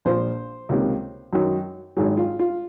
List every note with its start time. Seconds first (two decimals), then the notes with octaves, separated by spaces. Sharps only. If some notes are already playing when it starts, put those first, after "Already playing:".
0.05 A#1 A#2 F3 C5
0.69 C#2 C3 D#3 A#3
1.33 F#2 D#3 F#3
1.97 G#1 G#2 D#3 F#3 G#4
2.17 F4
2.39 F4